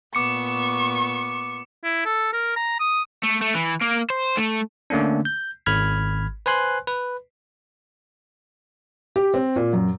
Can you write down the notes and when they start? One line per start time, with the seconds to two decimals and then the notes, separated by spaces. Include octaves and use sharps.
0.15 A#2 B3 C#6 D6 C#7
1.84 E4
2.06 A4
2.33 A#4
2.56 A#5
2.80 D#6
3.24 A3
3.42 A3
3.55 E3
3.81 A#3
4.10 C5
4.37 A3
4.90 D3 A3 A#3 C#4 D4
5.25 G6
5.66 G#1 B5 F6 G#6
6.46 B4 C5 G#5 C6 F#6
6.87 B4
9.16 G4
9.34 C4
9.56 A#2
9.73 F#2